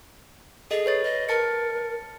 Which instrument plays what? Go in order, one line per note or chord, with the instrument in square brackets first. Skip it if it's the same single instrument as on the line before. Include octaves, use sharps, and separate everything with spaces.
[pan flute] G#4 [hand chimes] A4 D#5
[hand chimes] B4 C#5 A6
[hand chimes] B4 [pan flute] D#5
[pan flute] A#4 [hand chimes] A5 A6 C#7